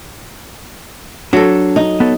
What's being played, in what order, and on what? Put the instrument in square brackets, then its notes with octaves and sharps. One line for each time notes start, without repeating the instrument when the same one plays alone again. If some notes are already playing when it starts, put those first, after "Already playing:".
[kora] F#3 A4 [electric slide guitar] D4
[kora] D#4
[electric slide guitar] B3 A4 C#5